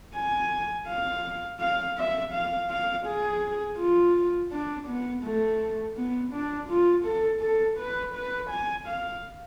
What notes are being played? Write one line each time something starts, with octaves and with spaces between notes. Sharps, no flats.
G#5
F5
F5
E5
F5
F5
G#4
F4
D4
B3
A3
B3
D4
F4
A4
A4
B4
B4
G#5
F5